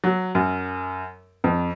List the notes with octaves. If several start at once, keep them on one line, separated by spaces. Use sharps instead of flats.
F#3
F#2
F2